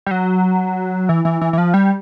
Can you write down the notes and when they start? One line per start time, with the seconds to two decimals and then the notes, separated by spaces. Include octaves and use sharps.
0.06 G3
0.11 F#3
1.09 E3
1.25 E3
1.41 E3
1.53 E3
1.58 F3
1.74 G3